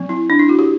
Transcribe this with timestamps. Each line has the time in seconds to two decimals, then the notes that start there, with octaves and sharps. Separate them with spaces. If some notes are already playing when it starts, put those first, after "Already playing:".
Already playing: F#3 C4
0.09 E4
0.30 D4
0.39 E4
0.49 F#4
0.59 G4